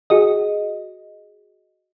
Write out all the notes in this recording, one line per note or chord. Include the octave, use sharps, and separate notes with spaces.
F#4 G#4 D#5